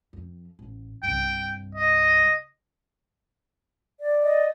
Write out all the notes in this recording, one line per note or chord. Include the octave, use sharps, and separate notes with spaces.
F2
A1
C2 G2 G5
D#5
D5
D#5